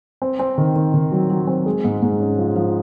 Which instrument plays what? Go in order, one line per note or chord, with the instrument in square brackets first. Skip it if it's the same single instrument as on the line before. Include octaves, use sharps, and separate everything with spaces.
[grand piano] C4
C4
D#3
D#3
D#3
F#3
F#3
C4
G#3
G#2
G#2
C#4
F3
F3